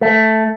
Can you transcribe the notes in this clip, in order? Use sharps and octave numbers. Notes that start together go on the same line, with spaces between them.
A3